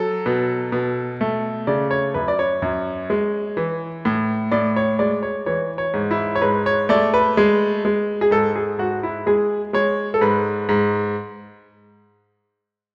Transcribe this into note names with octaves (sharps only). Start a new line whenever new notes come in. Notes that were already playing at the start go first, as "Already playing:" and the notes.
Already playing: F#3 A4
B2
B2
A3
C#3 D5
C#5
F#2 B4
D5
C#5
F#2
G#3
E3
A2
A2 D5
C#5
G#3 D5
C#5
E3 C#5
C#5
G#2
E4
C#5
G#2 B4
C#5
A3 D5
B4
G#3
G#3
G#4
G#2 A4
G#4
G#2 F#4
E4
G#3 G#4
G#3 C#5
A4
G#2 B4
G#2